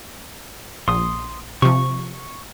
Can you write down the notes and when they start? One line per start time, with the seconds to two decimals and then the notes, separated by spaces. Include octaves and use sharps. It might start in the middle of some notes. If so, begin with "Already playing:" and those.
0.88 A#1 C6 D#6
1.62 C3 F3 C#6